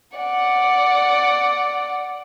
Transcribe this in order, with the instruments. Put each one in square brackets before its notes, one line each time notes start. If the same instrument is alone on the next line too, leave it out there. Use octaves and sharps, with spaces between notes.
[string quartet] D5 F#5